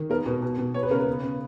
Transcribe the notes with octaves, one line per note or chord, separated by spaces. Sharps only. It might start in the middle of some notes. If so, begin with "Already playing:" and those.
Already playing: D#3
B3 A#4
B2
B2
B2
B3 C#5
B4
C#3 A#4
B4
B3
C#3